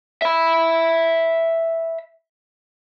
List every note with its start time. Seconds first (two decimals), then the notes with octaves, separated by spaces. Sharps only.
0.22 E5 B5